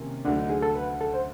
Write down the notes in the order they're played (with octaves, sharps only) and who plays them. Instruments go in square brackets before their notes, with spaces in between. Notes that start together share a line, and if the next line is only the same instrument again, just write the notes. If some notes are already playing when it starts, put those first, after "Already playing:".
Already playing: [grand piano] C3 D#3 A#3 C#4
[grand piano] D2 D3 F#3 A3 [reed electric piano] D4
[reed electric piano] D#4
G#4
A4
B4
A4
C5